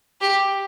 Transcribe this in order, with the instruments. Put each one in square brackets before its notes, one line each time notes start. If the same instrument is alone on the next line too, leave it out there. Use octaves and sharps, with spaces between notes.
[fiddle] G4